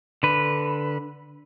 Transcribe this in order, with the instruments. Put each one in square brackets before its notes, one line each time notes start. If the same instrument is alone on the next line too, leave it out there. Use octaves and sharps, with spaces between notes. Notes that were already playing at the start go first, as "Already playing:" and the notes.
[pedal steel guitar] D3 B4